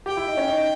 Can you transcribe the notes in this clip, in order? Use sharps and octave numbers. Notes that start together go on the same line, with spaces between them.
G4 G5
E4
D#4
C#4
D#4